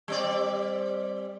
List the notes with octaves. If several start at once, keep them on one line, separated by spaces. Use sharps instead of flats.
G3 C4 D5